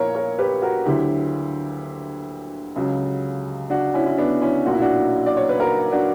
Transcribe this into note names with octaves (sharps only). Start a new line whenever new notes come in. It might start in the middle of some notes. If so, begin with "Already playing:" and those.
Already playing: A#1 A#2 E4 A#4 C#5
A#4 C#5
G4 B4
F#4 A#4
D2 D3 F#3 E4 G4
C#2 C#3 F#3
D4 F#4
C#4 E4
E4
B3 D4
C#4 E4
B1 A#2 F#3 F#4
E4
D4 F#4
D5
C#5
B4
F#4 A#4
D4 F#4